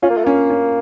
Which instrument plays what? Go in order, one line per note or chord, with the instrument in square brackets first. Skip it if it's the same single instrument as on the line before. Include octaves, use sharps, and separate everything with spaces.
[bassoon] C#4 [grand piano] F4
[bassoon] A#3
A3
[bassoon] A#3 [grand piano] C#4
[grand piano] C#4